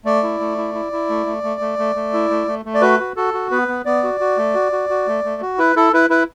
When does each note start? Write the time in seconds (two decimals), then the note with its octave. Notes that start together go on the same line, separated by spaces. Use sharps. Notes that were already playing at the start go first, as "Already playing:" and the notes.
0.05 A3 D5
0.23 E4
0.40 A3
0.58 E4
0.74 E4
0.92 E4
1.09 A3
1.26 A3
1.43 A3
1.61 A3
1.79 A3
1.96 A3
2.13 E4
2.30 A3
2.47 A3
2.65 A3
2.74 D5
2.81 F#4 B4
3.00 F#4
3.16 F#4 A4
3.34 F#4
3.51 B3 B4
3.68 B3
3.85 B3 D5
4.03 F#4
4.20 F#4
4.38 A3
4.54 F#4
4.72 F#4
4.90 F#4
5.07 A3
5.24 A3
5.42 F#4
5.58 E4 B4
5.76 E4 A4
5.93 E4 B4
6.10 E4 B4